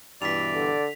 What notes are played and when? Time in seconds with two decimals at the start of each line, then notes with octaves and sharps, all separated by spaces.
0.22 G2 B2 E3 D5 B6 F7
0.53 D3